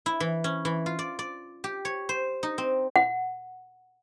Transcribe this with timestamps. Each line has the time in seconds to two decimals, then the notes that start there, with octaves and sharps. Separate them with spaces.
0.06 E4
0.20 E3
0.44 C#4
0.65 E3
0.86 F4
0.99 D5
1.19 D5
1.64 G4
1.85 C#5
2.09 C5
2.43 D#4
2.58 C4
2.96 F#5